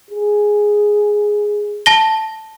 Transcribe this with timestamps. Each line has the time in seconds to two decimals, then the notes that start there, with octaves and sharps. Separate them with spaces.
0.10 G#4
1.86 A5 A#6 G7